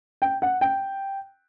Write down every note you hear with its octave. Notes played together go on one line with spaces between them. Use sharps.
G5
F#5
G5